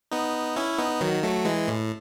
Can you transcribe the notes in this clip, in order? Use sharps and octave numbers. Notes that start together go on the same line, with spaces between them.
B3 D#4
C#4 E4
B3 D#4
D#3 F#3
F#3 A3
E3 G#3
A2